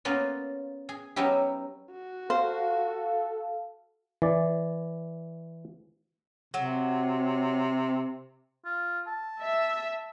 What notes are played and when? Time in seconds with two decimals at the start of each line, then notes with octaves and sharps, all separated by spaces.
0.05 A#3 B3 C#4 F4
0.89 G#4
1.16 F#3 B3 C#4 D#4 E4 G4
1.91 F#4
2.30 A4 C5 F5
4.22 E3 D5
6.54 C3 F#3
8.65 F4
9.07 A5
9.41 E5